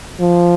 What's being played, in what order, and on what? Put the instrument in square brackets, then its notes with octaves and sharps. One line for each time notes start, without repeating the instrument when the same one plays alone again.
[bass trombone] F3